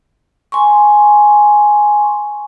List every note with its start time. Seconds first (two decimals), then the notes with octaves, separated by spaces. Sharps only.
0.52 G#5 C6 C#6